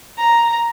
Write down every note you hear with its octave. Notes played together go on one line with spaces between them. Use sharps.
A#5